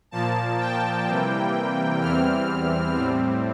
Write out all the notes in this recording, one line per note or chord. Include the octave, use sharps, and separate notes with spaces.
A#2 F3 A#3 A5
G5
C3 E3 G3 A#3
E2 E3 G3 C4 F6
A2 G3 C4